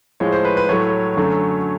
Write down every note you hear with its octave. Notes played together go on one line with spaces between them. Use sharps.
A2 F3 G#3 C#5
C5
B4
B4
A2 F#3 A3 C#5
F#2 D3 F#3 A3